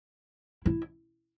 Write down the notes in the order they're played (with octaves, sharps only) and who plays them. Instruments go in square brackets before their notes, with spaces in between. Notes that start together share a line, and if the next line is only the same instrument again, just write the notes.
[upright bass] E4